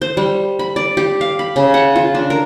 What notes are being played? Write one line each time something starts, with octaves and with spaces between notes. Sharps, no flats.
C5
G3
B5
D5
G4
F5
B5
C#3
F#5
F4
D4
A#4